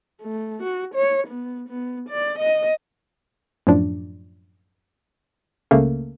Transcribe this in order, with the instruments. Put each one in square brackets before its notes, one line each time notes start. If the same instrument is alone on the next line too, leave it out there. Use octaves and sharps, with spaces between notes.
[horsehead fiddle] A3
F#4
C#5
B3
B3
D5
D#5
[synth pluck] F#2 A2 F3 D4
C#2 C#3 A3 A#3